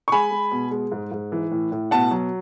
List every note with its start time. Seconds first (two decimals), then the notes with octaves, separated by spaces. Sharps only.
0.08 C#6
0.12 G#3 G#5 B5
0.31 G#3
0.51 B2
0.71 G#3
0.92 G#2
1.12 G#2
1.32 E3
1.52 A2
1.72 A2
1.91 B2 F#5 A5
2.11 F#3